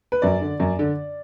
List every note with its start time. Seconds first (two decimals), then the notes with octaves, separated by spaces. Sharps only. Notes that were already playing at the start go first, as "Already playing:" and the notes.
0.12 B4
0.22 F#2 D5
0.42 D3
0.60 F#2
0.79 D3